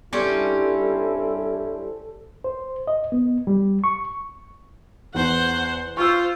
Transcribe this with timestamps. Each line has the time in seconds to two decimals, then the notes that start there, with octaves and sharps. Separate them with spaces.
0.13 G2 G3 C4 C#4 E4 A4
2.44 C5
2.88 D#5
3.12 B3
3.47 G3
3.84 C#6
5.14 E2 C5 F#5
5.97 F4 C5 C#6 E6